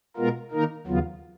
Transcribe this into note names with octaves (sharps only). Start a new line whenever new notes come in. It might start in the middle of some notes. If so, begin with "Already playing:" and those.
B2 G#3 B3 F4 A#4
D#3 A#3 D#4 A#4
D#2 C#3 F#3 B3 F4